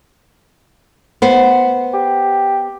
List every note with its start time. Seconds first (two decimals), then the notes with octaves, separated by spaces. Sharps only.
1.22 B3 C5
1.94 G4